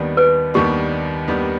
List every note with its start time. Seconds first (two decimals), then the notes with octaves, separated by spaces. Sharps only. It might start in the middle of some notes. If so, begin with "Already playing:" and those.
Already playing: D#2 D#3 G3 B3 D4
0.17 B4
0.54 D#2 D#3 G3 B3 D4 G4
1.28 D#2 D#3 G3 B3 D4